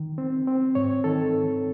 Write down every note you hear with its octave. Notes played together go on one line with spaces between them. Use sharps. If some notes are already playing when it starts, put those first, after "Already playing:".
Already playing: D#3
C4
C4
G#2 C#5
D#3 A4